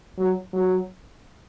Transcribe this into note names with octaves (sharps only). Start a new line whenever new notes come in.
F#3
F#3